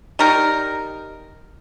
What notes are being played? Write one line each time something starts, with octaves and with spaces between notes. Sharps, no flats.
G3 D#4 A#4